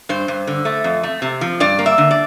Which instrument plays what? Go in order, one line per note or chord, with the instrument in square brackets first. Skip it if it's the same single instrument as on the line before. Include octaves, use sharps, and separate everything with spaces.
[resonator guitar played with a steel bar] G2 C5
G2
D3
A3
F2
A3
C3
F3
G2 D5
A#3
E5
D3
D5